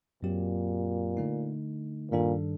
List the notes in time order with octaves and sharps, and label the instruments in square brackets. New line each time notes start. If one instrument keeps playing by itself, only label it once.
[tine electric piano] F#2 F#3 C4 G4 [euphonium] A#2
[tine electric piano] D3 A3 D#4
[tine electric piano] G2 D#3 G3 D4 A4 [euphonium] A#2